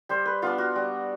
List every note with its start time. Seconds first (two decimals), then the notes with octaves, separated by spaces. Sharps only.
0.09 G3 C5
0.26 B4
0.42 B3 D4 F4
0.58 F#4
0.76 G3